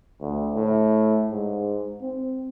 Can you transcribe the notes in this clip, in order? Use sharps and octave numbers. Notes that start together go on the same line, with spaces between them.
D2
A2
G#2
C4